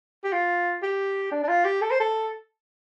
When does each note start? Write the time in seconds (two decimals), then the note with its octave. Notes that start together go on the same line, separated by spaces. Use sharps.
0.24 G4
0.32 F4
0.82 G4
1.32 D4
1.43 D4
1.49 F4
1.65 G4
1.82 A4
1.91 C5
2.00 A4